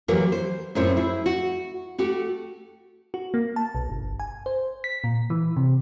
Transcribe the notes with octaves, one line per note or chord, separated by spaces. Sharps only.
E3 F#3 A#3 F#4 G4 A#4
C5
F#2 A2 C4 E4 C5 C#5
E4 G#4
F#4
A3 F#4 G4
F#4
A#3
A5
B1
G1
G#5
C5
B6
A#2
E3
C3